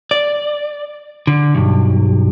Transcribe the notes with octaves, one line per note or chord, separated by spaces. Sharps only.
D5
D3
B1 G2